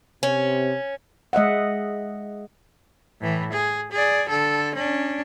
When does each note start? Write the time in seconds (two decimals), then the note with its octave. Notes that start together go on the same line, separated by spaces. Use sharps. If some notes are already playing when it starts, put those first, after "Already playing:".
0.23 C3 C#4
1.33 G#3 D#5 E5 F#5
3.21 A2 E3
3.53 G#4
3.92 G#4 D5
4.29 D3 A4
4.75 C#4 D4